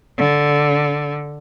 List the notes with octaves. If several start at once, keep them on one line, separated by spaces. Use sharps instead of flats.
D3